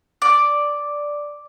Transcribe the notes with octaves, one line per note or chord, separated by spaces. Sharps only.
D5